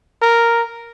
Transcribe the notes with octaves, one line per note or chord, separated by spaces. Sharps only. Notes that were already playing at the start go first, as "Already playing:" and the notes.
A#4